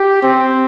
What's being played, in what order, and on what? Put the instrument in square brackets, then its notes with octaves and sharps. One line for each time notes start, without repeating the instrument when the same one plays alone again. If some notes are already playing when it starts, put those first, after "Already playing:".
Already playing: [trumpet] G4
C4